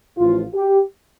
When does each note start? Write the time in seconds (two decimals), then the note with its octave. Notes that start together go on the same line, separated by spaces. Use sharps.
0.18 A1 A2 F3 F4
0.55 G4